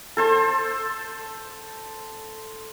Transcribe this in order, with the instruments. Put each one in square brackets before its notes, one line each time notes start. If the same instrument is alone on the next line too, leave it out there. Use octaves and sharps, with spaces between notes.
[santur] A4 C5 A5